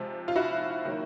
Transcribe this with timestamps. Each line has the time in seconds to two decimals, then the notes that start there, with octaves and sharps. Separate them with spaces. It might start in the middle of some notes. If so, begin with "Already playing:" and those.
Already playing: C3 F3 G#3
0.28 F4
0.36 E4 F#4
0.85 D#3 F#3 A#3